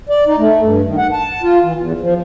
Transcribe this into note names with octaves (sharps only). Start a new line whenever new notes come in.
D5
D#4
A3
G2
D#3
F#5
A5
F4
E3
E2
F3